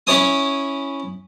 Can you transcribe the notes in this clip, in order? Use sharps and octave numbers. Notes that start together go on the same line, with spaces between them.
C#4 E4 C#5 G#5 D#6